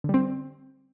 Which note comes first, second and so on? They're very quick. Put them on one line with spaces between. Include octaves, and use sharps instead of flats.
D3 G3 C4